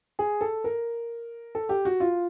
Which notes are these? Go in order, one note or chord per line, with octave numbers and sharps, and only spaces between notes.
G#4
A4
A#4
A4
G4
F#4
F4